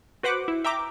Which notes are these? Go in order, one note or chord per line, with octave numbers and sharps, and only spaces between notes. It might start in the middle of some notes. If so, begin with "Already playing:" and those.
F#4 B4 C5 F#5 D6
E4
E5 G5 A#5 D6